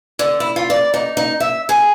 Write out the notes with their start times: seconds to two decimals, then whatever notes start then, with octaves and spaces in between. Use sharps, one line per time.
0.19 D3
0.40 E4
0.56 F4
0.70 D5
0.94 D#4
1.17 D#4
1.40 E5
1.69 G#4